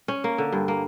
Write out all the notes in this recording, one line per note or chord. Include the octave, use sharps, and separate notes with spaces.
C#4
A#3
D3
G2
A#3